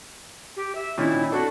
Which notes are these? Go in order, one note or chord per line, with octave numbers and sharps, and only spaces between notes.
G4
E5
A#2 D#3 C#4 E4
D4 F#4 A4